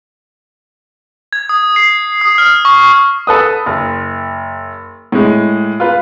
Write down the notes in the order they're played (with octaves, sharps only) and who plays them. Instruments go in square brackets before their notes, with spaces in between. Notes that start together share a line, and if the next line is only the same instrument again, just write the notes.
[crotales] G#6
D#6
C7
D#6
F6
C#6
[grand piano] A4 B4 D#6
F#1
A2 G#3
F4 B4